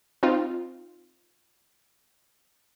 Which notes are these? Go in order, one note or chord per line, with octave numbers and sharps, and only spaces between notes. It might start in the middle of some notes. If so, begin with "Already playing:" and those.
C4 D#4 F4